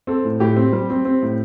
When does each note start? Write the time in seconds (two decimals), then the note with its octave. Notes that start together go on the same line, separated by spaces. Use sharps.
0.07 C4 A4
0.25 A2
0.40 A2 G4
0.56 C4
0.73 G3
0.90 C4
1.05 C4
1.23 A2